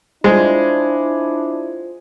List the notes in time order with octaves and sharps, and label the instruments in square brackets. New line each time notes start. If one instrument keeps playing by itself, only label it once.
[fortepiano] G#3 [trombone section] D4 E4 [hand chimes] F4 C5